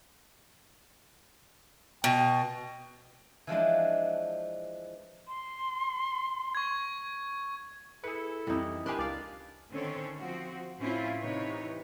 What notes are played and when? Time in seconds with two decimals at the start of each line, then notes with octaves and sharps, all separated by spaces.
2.04 B2 G5
3.47 E3 F3 G#3 D4
5.28 C6
6.55 C#6 G#6
8.04 E4 G#4 A4 B4 C#7
8.47 F2 E3 G3 D#4
8.86 D4 G4 A#4 B4 G#5 C6 F#6
8.98 C#2 D5 F5
9.71 D3 D#3 C4 C#4 A4 C#5
10.18 F3 C4 F#4
10.79 A2 C4 C#4 E4 F4
11.19 C3 E3 D#4 B4 C#5